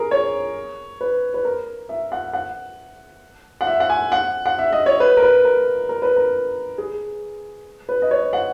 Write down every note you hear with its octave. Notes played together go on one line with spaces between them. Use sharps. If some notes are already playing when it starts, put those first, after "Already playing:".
Already playing: G#4 A#4
C#5
B4
B4
A#4
E5
F#5
F#5
F#5
E5
F#5
G#5
F#5
F#5
E5
D#5
C#5
B4
A#4
B4
A#4
A#4
B4
A#4
G#4
B4
D#5
C#5
F#5